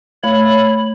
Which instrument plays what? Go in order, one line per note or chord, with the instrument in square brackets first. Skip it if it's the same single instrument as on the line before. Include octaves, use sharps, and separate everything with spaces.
[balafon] A3 [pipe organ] C#5 B5